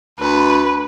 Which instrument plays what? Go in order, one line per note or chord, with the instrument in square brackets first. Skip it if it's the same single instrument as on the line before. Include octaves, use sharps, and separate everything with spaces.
[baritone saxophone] D2 [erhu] B4